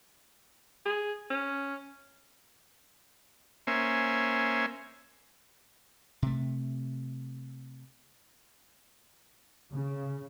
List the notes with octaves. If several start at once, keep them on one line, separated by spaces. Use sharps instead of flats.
G#4
C#4
A#3 C#4 C5 E5 G#5
C3 A3
C#3